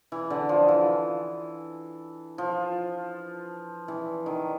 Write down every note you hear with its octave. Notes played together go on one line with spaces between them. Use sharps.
E3
D3
F3
E3
F3
E3
D#3